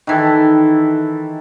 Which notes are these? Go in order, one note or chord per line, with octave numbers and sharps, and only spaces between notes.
D#3 E3 A4